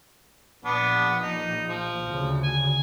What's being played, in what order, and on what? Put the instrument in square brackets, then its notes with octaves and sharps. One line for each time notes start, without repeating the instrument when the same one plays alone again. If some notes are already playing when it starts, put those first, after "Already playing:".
[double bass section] A#1 [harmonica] B3 D4
[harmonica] D#4
F3
[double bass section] D2 C#3
[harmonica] G#5